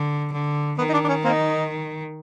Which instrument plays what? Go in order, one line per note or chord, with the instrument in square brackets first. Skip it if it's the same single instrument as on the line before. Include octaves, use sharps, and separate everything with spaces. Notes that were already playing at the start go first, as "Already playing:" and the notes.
Already playing: [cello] D3
D3
[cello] D#3 [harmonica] B3
[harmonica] D#4
D4
D4
C#4
A#3 C4 D#4